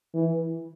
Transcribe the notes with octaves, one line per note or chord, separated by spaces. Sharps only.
E3